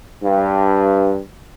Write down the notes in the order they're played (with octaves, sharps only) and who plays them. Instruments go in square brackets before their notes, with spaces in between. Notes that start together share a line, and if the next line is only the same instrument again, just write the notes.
[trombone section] G2